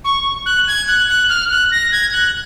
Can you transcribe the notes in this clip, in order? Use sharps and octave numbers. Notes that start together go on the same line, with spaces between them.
C#6
F#6
G#6
F#6
F#6
F6
F#6
A#6
G#6
F#6